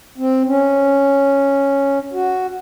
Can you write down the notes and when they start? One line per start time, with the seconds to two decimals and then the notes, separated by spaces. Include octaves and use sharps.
0.18 C4
0.47 C#4
2.13 F#4